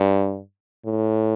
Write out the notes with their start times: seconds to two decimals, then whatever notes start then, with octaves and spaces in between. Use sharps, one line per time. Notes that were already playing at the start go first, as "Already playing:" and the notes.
Already playing: G2
0.85 A2